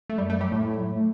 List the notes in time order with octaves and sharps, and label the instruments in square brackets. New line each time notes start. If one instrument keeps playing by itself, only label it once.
[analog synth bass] A3
[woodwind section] F#2 [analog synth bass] G3
[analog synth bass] A3
[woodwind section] F#3
[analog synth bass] G3
[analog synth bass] A2 [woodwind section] A3
[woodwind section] E4
F#3
A3